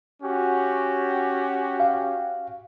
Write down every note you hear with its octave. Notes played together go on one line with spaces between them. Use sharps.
C#4 F#4 G4
F5